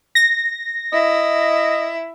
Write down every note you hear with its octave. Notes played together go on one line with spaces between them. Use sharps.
A#6
E4 D#5